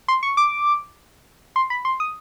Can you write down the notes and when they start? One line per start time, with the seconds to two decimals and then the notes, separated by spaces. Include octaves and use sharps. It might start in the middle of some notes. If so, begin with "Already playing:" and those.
0.08 C6
0.23 C#6
0.37 D6
1.56 C6
1.70 B5
1.85 C6
2.00 D#6